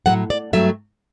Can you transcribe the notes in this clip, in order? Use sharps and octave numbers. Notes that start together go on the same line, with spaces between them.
A2 F#3 A3 F#5
D5
G2 F#3 A3 E5